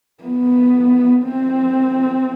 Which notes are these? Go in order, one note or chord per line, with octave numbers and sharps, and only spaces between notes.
B3
C4